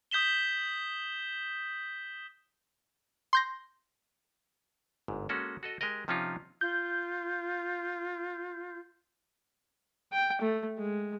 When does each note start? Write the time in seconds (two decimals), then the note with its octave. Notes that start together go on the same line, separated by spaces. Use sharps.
0.11 D#6 G6 B6 E7 G7
3.33 C6 G6 A#6
5.08 G1 G#2
5.29 G#3 A#3 C#4 F#4 A4
5.63 F#4 A4 D#5
5.81 G#3 G4 A#4 D#5
6.08 C3 F3 C#4 D#4 F4
6.61 F4 G6
10.12 G5
10.41 A3
10.78 G#3